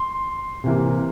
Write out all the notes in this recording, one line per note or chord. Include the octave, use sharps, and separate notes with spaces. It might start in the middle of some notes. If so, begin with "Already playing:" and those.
Already playing: C6
C3 E3 A#3